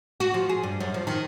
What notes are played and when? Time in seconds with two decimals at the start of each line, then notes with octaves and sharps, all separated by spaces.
0.20 F#4
0.34 F3
0.49 G#4
0.63 G2
0.80 F#2
0.94 F3
1.07 D#3